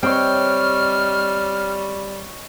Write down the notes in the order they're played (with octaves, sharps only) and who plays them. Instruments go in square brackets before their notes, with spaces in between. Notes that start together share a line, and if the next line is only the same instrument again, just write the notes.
[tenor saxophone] G3 [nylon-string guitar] C4 [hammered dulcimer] C#5 D#5 G5 [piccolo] F6